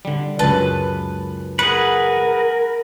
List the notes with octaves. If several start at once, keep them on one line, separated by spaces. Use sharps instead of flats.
D3 G3
C#2 F#2 B4 A5
G#4 A#4 B4 F#5